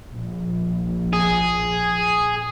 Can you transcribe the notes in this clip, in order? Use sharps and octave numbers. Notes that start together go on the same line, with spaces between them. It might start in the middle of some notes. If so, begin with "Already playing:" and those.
A#1
G#4